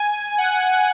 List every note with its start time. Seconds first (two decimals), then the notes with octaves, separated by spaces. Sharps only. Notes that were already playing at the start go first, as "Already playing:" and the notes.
Already playing: G#5
0.38 F#5